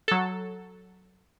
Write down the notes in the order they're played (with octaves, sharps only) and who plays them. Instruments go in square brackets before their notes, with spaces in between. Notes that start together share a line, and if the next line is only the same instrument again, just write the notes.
[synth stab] F#3 A4